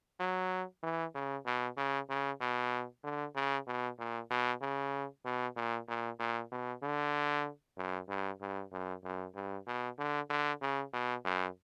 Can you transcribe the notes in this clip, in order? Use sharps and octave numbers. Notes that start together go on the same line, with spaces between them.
F#3
E3
C#3
B2
C#3
C#3
B2
D3
C#3
B2
A#2
B2
C#3
B2
A#2
A#2
A#2
B2
D3
F#2
G2
G2
F#2
F#2
G2
B2
D3
D3
C#3
B2
F#2